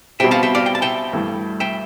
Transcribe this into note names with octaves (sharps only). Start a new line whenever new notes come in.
B2 G3 C4 E5 G5
F5 A5
E5 G5
D5 F5
G5
A5
E5 G5
G2 E3 A3
E5 G5